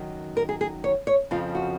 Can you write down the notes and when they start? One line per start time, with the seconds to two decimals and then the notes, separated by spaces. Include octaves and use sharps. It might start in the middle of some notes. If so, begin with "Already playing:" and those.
Already playing: F#2 D#3 F#3
0.37 A#4
0.49 G#4
0.61 G#4
0.84 C#5
1.07 C#5
1.31 F2 C#3 F3 F4
1.55 F#4